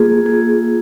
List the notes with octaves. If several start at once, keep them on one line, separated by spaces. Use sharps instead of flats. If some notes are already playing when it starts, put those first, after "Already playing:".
Already playing: A#3 F4 G#4
G#4